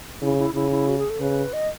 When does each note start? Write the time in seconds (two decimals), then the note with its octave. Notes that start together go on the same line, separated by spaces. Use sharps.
0.21 C#3 E4
0.38 E4
0.55 C#3 E4
0.71 E4
0.88 F#4
0.98 G#4
1.10 A4
1.20 C#3 B4
1.53 D#5